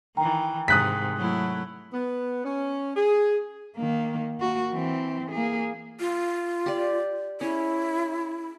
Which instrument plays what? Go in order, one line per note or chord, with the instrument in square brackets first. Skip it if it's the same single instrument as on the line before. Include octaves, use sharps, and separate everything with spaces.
[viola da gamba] D#3 E3 [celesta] G5 A#5
[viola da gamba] G#2 C3 D#3 [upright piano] D#6 F#6 B6
[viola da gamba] F#3 A3 E4
[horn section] B3
C#4
G#4
[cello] D#3 A#3
A#3 F#4
E3 C4
A#3 G#4
[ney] F4
[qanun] G4 D5
[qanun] C#4 G#4 C#5 [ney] E4